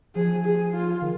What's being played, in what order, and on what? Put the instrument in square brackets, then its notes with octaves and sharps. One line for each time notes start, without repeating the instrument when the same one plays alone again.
[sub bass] F3 [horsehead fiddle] G#4
[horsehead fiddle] G#4
F4
[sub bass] D#3